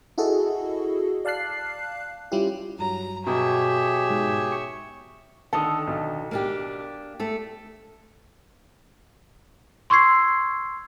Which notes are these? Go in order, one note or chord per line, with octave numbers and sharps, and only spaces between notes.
E4 F#4 G#4 A4 D#5
D5 F5 A5 F#6 C7
G3 C#4 E4 F4 G4
G2 F#3 A#5
B2 G4 G#4 C#5 E5
G#2
C#6
D3 D#3 A4 D#6
B1
A#3 D4 G4
A3 A4
C6 C#6 E6 G#6 C7